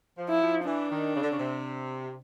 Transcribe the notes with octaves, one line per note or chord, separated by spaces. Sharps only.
F3
E4
F3
E3 D4
D#3
C#3
D3
C#3
C3